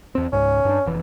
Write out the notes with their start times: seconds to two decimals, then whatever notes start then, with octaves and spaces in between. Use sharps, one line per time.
0.15 E2 C4
0.33 C#2 G#2 C#4
0.65 G2 D4
0.86 F1 E3